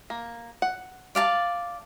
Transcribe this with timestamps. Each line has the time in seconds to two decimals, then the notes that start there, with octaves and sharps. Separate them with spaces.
0.10 A#3
0.62 F#5
1.15 D5 F5 A5